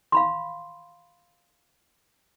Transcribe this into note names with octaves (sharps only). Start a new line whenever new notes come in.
F5 B5 C6